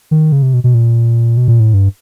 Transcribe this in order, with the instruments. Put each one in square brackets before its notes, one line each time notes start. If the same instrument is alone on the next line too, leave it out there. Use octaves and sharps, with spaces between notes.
[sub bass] D#3
C#3
C3
B2
B2
A#2
B2
A#2
A2
G2